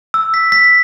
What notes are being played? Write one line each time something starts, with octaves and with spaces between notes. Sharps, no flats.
E6
B6
B6